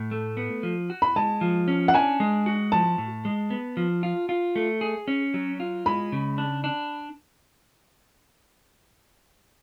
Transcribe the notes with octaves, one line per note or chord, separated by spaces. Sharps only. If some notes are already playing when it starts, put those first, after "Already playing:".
Already playing: A2
A3
B3
F3
F#4
B5
G#3 A5
F3
C#4
F#5
D4 G#5
G#3
F#4
F3 A5
A2
G#3
B3
F3
F4
F4
A3
G#4
C#4
F#3
F4
G#3 B5
C#3
D4
D4